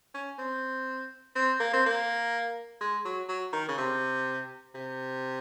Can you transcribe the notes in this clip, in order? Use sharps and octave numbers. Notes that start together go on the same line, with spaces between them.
C#4
C4
C4
A#3
C4
A#3
G#3
F#3
F#3
D#3
C#3
C3
C3